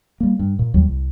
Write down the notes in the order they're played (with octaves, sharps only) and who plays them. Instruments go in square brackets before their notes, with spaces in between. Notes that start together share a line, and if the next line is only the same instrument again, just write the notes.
[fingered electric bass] G3 A#3
G2
A#2
D#2 F#3 G3
C2